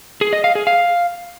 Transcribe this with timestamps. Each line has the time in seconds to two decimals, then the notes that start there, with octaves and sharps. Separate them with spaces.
0.21 G#4
0.33 D#5
0.44 F5
0.55 G#4
0.67 F5